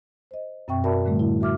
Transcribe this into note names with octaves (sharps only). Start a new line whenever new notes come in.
C5 D#5
F#2 B2 C4 E5 G5 C#6
F#4 A#4 D5 E5 A5 B5
A2 D3 G3 A3
E4
F#4 E5 D6 F6